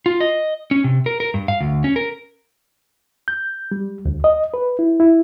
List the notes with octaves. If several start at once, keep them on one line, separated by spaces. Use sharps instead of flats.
F4
D#5
C#4
C3
A#4
A#4
G2
F5
D2
C#4
A#4
G6
G3
D2
D#5
B4
E4
E4